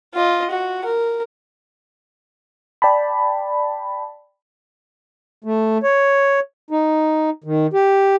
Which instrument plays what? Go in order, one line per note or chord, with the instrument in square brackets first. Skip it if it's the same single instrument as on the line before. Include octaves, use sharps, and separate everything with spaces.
[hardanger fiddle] F4 D#5
F#4
A#4
[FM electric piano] D5 G5 A5 B5
[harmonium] A3
C#5
D#4
D#3
G4